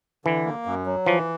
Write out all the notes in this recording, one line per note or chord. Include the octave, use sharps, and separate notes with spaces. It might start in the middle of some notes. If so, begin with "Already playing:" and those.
D3 E3
A#3
F#2
F#3
E3 F3